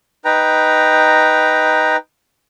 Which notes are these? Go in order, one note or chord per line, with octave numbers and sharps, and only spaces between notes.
D#4 B4 G5 A#5